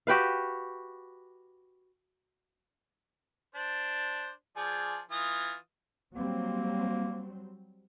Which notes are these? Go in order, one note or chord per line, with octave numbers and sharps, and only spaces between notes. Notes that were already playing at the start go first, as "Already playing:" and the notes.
F#4 G4 B4 F5
D4 C5
F3 G#4 D5
E3 F4 D#6
F#3 G3 A#3 C4